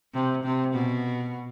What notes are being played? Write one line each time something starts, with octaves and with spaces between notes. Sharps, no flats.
C3
C3
B2